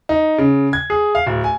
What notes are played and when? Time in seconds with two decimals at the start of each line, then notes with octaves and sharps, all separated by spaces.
0.09 D#4
0.38 C#3
0.73 G#6
0.90 G#4
1.15 F5
1.26 D1
1.44 G#5